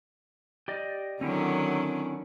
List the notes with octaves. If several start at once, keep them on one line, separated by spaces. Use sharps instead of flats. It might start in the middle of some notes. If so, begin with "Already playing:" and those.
G4 D5 D#5
D3 D#3 F#3 C4 C#4 E4